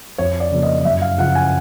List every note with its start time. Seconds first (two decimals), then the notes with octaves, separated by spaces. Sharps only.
0.18 F2 C#5
0.40 D5
0.51 C#3 F3 A#3
0.63 D#5
0.79 D#5
0.85 F#2 E5
1.01 F5
1.18 C#3 F3 F#5
1.35 G#5